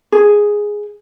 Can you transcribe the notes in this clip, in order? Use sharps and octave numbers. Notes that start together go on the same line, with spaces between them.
G#4